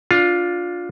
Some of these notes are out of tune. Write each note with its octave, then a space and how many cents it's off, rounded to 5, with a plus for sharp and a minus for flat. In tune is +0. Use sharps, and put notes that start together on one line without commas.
D4 -10 F4 +10